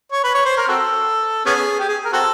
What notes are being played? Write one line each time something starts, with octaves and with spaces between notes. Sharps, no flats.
C#5
B4
C#5
C5
A#4
C4 F#4 A4
B3 C#4 G#4
G4
G#4
A#4
C4 F#4 A4